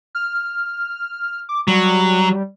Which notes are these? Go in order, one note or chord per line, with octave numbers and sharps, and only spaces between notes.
F6
D6
F#3 G3